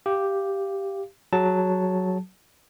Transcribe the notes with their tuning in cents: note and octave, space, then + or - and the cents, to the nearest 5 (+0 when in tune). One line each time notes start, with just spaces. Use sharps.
G4 +0 F5 -15
F#3 +0 G#4 +20 A5 +0